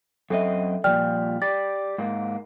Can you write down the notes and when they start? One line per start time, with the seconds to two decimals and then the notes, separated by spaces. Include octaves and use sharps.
0.30 F#2 C4 A4 D#5 E5
0.84 A#2 F3 G3 D5 G5 F6
1.42 G4 D5 A6
1.98 G#2 A#3